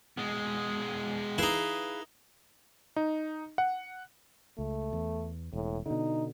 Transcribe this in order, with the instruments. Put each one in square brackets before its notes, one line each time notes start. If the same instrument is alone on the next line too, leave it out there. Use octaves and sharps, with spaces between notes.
[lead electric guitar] B2 G#3
[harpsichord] D#4 E4 [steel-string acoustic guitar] G#4 B4 F5
[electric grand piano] D#4
F#5
[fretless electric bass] C#2 [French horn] A3
[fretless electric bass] E2
[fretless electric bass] E1 [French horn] A2
[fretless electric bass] B2 D3 [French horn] D#4